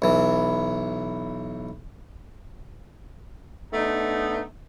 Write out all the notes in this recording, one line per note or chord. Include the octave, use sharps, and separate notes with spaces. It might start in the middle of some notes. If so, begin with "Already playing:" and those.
B1 E3
A3 B3 D4 D#4